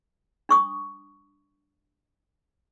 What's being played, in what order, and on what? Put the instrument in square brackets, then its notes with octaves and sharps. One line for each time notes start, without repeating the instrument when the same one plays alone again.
[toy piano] D4 C#6 D#6